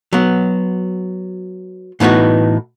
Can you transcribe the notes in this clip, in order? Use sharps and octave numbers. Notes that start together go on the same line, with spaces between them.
F#3 B3
A2 E3 B3 D#4 F#4